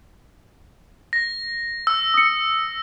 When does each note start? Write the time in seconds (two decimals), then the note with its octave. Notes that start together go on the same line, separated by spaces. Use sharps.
1.13 A#6
1.87 E6
2.14 D#6 C#7